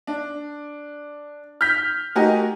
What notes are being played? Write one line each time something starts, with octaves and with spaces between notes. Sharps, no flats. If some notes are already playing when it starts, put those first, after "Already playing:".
D4
F6 G6 B6
A3 D#4 F#4 G4 A#4 G#5